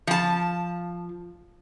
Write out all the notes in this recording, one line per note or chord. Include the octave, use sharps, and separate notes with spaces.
F3 A5